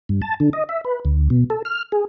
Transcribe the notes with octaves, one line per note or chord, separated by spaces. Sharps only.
G2
A5
D3
D#5
E5
B4
D2
B2
A4
F6
G#4